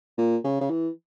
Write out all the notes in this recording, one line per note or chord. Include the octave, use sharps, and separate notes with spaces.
A#2
C#3
C#3
E3